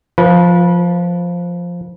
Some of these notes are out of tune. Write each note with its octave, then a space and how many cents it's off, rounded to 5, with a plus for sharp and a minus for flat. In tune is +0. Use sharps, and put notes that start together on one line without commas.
F3 +5 B4 -30